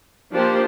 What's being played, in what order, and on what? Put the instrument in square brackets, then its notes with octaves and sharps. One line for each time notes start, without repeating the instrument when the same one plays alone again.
[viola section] F3 A#3 D4 G4 C5